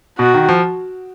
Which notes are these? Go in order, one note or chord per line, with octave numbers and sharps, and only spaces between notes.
B2 F#4
D#3
F3